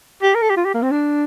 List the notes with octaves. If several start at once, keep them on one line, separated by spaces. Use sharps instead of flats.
G4
A#4
A4
G4
F4
G4
A#3
C4
D4